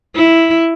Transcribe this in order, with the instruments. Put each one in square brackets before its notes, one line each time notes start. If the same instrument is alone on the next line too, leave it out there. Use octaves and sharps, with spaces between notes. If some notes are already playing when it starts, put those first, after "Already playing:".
[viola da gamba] E4